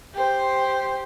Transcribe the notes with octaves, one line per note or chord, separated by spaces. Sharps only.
G4 C5